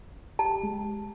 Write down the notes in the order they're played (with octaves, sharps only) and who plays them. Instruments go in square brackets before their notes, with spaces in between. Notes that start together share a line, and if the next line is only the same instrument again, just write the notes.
[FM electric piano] G4 [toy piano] A5
[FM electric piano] G#3